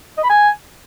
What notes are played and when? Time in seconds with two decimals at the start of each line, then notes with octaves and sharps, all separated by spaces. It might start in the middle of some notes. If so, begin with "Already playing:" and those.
0.18 D#5
0.24 B5
0.30 G#5